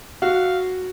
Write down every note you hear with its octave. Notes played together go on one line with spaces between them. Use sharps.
F#4 F5